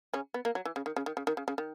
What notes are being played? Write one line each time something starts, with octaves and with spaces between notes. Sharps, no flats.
C#3 C#4
B3
A#3
F#3
E3
C#3
D#3
C#3
D#3
C#3
D#3
C#3
C#3
D#3